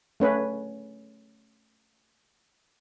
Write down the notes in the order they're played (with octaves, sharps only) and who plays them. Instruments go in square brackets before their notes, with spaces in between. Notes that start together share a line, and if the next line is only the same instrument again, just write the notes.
[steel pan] A3 C#4 B4